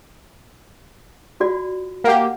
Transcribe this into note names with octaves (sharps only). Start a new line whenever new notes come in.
F4 F#4 D5
A#3 G4 F5 F#5